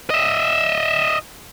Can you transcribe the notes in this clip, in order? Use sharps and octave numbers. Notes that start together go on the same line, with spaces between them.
D#5 E5